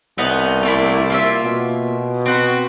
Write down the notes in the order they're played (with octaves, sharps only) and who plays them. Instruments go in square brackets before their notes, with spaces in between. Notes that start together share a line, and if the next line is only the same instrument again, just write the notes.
[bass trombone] C2 [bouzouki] B3 D#4
[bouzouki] A3 A#3 E4
A#3 F4 E5
[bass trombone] B2
[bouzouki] C4 F#4 B4